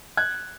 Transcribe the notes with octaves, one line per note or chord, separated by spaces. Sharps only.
F#6 G#6